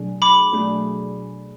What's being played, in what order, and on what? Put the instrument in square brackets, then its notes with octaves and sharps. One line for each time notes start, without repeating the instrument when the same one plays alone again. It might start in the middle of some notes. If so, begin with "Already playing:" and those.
Already playing: [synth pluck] B2 F#3 A3 D4 G#4
[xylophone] B5 D6
[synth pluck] B2 F#3 A3 D4 G#4